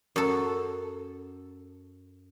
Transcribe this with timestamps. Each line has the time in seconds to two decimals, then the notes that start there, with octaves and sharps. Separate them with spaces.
0.16 F#2 A4